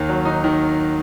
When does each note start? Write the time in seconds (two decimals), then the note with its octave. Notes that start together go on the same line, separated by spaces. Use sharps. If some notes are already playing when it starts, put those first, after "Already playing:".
Already playing: D#2 D#3
0.09 F#3
0.25 D#4
0.44 D#3